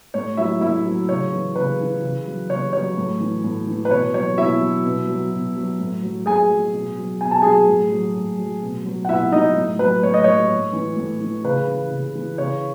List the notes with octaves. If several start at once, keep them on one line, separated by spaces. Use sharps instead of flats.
A2 C#5
F#3 E4 E5
A2 E4 E5
F#3
C#3 C#5
E3
C#3 B4
E3
C#3
F#3
C#3 C#5
F#3 C#5
A2
E3
A2
E3
B4
B2 C#5
F#3 C#5
B2 E4 E5
F#3
B2
F#3
B2
F#3
A2
F#3
A2 G#4 G#5
F#3
B2
F#3
B2 G#5
A5
F#3 G#4 G#5
A2
F#3
A2
F#3
B2
F#3
F#5
B2 E4 E5
F#3 D#4 D#5
A2
F#3 B4
A2 C#5
D#5
F#3 C#5
A2
E3
A2
E3
C#3 B4
E3
C#3
E3
C#3 C#5